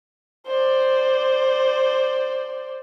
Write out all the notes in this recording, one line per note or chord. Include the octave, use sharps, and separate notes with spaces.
C5 D5